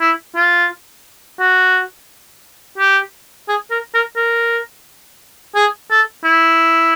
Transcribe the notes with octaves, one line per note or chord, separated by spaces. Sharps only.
E4
F4
F#4
G4
G#4
A#4
A#4
A#4
G#4
A4
E4